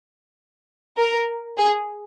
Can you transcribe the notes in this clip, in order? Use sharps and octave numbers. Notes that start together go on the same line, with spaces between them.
A#4
G#4